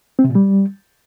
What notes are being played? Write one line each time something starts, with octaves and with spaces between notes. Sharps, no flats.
C4
C3
A#2
G3